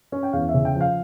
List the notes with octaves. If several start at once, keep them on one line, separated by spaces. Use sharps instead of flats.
C#4
G5
E2 F5
E5
C#3
G5
F3
F5